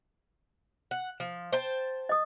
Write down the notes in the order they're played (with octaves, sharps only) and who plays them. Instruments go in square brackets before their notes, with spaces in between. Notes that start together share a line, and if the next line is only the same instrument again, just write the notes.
[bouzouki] F#5
F3
C5 G5 A5
[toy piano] D#5 D#6